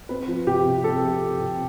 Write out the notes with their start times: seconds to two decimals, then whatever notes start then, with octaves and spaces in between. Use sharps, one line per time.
0.09 C4 B4
0.28 F3
0.47 C3 G4
0.65 C3
0.84 C4 A4
1.03 F3
1.21 C3
1.39 C3